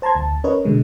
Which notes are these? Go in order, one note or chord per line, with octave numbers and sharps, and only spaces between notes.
C5 A5 A#5 C6 G#6
D2 A5
C#4 A#4 B4 C#5 D#5
B2 D3 G#3